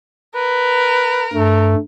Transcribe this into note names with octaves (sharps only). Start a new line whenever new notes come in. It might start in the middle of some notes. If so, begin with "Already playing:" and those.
A#4 B4
G2 A3